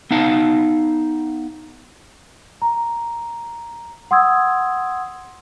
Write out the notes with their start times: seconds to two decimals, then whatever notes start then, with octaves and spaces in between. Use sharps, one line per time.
0.11 B3 D#4 F5 A5
2.62 A#5
4.11 F#5 C6 D#6 E6 G#6